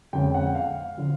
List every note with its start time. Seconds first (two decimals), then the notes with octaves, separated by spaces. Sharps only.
0.13 F2 D3 F3 G#3 C#4 G5
0.34 F#5
0.55 F5
0.98 D3 F3